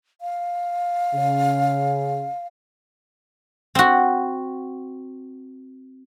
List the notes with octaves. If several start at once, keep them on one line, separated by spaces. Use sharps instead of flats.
F5
C#3
C4 F#4